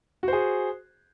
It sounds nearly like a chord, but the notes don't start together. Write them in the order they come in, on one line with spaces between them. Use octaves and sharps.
F#4 C5 G#4